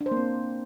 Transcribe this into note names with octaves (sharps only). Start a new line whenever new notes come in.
D4
C5
A#3
C4